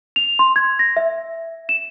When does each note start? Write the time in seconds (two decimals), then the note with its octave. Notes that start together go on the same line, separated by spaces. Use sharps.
0.16 F7
0.39 C6
0.56 G#6
0.79 A#6
0.97 E5
1.69 E7